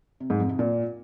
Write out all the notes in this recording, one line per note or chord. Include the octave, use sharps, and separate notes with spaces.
C3
G#2
F2
C3
A#2